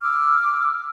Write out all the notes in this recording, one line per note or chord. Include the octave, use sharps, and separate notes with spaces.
D6 E6 F6